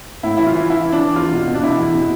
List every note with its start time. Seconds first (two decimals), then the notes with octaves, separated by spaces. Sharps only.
0.23 A2 E4
0.37 E3 E4
0.47 F4
0.54 E3
0.70 E3 E4
0.85 E3
0.92 D4
1.01 E3
1.16 E2 F4
1.32 B2
1.48 B2
1.55 D4
1.62 B2 E4
1.78 E2
1.94 B2